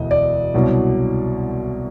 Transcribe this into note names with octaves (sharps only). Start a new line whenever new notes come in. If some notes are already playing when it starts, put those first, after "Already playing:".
Already playing: E1 D2 D#5
D5
C2 B2 F#3